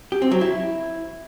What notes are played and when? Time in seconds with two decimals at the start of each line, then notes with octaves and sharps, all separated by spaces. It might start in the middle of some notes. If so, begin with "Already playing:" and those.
0.12 G4
0.22 C4
0.31 F#3
0.41 E4